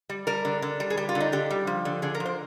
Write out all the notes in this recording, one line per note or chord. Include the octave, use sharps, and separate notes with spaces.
G3
G3 A#4
D3
D3
G3
G#4
G3 G4
F4
D3
D#4
D3 G4
G3
F3
D3
D3 G#4
A#4
F3
C5